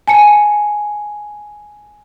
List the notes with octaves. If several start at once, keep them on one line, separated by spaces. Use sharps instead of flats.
G#5 A5 C#7